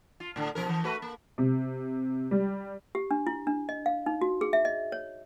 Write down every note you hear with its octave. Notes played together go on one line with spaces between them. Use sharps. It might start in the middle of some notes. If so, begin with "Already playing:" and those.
F4
A2 D3
B2 F3 A#4
E3
A3 F#4 B4
A#3
C3
G3
G4
D4
E4
D4
D#5
F5
D#4
F#4
G#4
E5
D#5
C#5